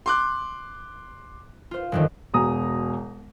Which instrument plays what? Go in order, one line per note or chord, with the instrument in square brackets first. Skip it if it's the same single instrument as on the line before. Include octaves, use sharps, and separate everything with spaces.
[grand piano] C6 D6 F#6
[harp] F4 C5
G1 F2 D#3
[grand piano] E1 B2 G#4 A#5 D#6